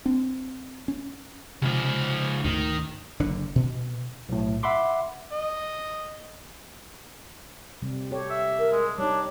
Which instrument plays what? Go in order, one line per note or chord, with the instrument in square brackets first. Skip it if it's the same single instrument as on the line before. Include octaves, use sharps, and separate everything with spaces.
[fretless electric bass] C4 D4
C#4
[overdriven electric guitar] C#2 F3 [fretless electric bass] C3
[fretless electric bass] D2 G#2 [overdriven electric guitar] D#3
[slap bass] F#1 D3 D4
B2
[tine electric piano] B1 A2
E5 F#5 B5 C6 D6
[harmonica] D#5
[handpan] C3 G3
G4 A4 C#5
[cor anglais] E5
[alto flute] A#4
[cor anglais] G#3
[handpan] G3 D#4 [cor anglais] D4 [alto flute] C#5